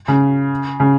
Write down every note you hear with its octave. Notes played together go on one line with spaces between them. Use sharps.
C#3
C#3